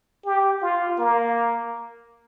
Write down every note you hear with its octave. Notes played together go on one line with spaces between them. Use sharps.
G4
F4
A#3